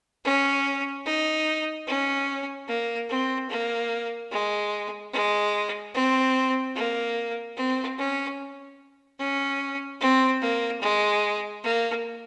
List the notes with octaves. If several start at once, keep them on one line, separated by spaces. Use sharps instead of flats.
C#4
D#4
C#4
A#3
C4
A#3
G#3
G#3
C4
A#3
C4
C#4
C#4
C4
A#3
G#3
A#3